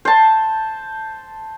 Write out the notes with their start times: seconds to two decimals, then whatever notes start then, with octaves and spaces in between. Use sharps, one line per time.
0.05 C5 A5